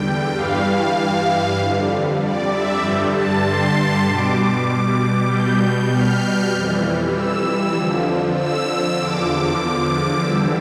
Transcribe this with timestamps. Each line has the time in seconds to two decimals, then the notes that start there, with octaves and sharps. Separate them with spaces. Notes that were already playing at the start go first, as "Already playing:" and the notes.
Already playing: E2 D3 G3 G5
0.33 G2 E3 G3 F5
0.96 F5
1.57 F2 D3 G3
2.19 D5
2.49 E5
2.80 G2 D3 G3 G5
3.11 A5
3.42 C6
4.04 B2 G3 D6
5.27 B2 G3 G6
5.90 F6
6.50 F2 E3 G3
7.13 E6
7.74 F2 D3 F3
8.36 E6
8.97 E2 D3 F3 D6
10.20 E2 D3 G3 E6